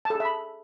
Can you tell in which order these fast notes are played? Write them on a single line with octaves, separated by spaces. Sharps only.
A5 A4 G#4 E5 B5